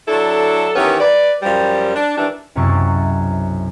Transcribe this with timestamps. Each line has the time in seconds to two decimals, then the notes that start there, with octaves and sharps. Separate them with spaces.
0.08 F#3 D4 E4 A4
0.76 D#3 E3 B3 C#4 G4
1.00 B4 D5
1.42 F#2 F3 G3
1.95 D4
2.17 D#3 E3 G3 D4
2.55 B1 F#2 C3 E4 C#6 A6